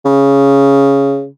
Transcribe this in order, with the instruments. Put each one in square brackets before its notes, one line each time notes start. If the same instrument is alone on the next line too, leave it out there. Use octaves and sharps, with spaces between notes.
[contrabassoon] C#3